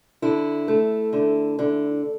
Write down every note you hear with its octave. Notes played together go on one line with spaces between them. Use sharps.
D3 E4
A3
D3
D3